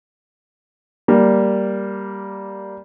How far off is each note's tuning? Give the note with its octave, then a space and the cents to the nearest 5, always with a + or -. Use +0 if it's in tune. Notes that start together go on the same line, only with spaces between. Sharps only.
G3 +0 A#3 +0